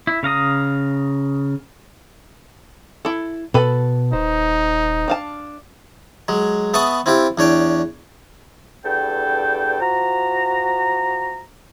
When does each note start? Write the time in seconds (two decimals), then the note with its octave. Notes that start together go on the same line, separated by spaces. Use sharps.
0.07 E4
0.23 C#3 F5 A#5 D#6
3.05 E4 A4
3.54 B2 A4 B4 A5 B5
4.13 D#1 D#4 C5
5.08 D4 F5 A5
6.28 F#3 G#3
6.74 B3 E5 A5 B5 C#6 D#6
7.06 C4 E4 F4 G4 E5
7.38 E2 D4 C#5 G5
8.83 E2 G2 A4 G5
9.80 F3 F#4 A#5